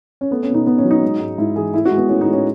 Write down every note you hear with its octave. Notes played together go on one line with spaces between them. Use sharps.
C#4
A3 B3
C#4
B2
D#4
B2 B3
C#4
F#3
D#4
G#3
G#2
G#2 E4
E3 G#4
A2 E4
F#4
G#3
B3
A2 C#4
D#4
G#3
C#4